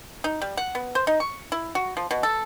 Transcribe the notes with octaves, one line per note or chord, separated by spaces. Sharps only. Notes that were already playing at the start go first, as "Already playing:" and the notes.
D#4
G3
F#5
B3
C5
D#4
C#6
E4
F#4
F3
B2
A4